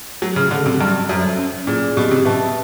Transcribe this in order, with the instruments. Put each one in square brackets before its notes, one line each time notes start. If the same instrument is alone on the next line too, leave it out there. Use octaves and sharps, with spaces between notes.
[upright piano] F#3 [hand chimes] A3
[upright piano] C#3
[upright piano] D3 [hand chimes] D4 F#4 A4
[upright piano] C3
[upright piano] G2 [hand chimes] F#4
[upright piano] F#2 [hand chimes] A4 C5 E5 A5
[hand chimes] C#4
[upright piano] A#2 [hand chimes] E4 G#4
[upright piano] B2 [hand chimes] G4
[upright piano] C3
[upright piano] B2 [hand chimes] B4 E5 A5